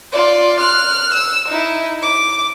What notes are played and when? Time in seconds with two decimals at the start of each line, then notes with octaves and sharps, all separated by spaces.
0.13 F4 D5
0.60 F6 F#6
1.14 E6
1.49 D#4 E4
2.03 D6